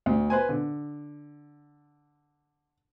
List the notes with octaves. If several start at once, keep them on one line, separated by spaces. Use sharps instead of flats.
D2
B4 C5 G#5
D3